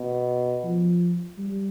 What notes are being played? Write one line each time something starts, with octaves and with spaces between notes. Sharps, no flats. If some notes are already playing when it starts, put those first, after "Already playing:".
Already playing: B2
F3
G3